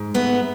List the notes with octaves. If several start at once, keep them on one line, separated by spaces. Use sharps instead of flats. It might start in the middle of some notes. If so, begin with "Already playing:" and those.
Already playing: G#2
A3 B3